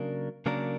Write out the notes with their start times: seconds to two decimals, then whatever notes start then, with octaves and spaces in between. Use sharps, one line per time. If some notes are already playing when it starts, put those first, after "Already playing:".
Already playing: C#3 F#3 A#3 D4 A#4
0.46 C#3 F#3 A#3 D4 A#4